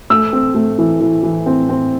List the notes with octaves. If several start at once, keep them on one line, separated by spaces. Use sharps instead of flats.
A3 E6
C4
A3
E3
E3
E3
C4
C4